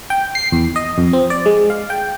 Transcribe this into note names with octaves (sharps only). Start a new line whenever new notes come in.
G5
C7
E2
D#5
F2
C4
D5
G#3
F5
G5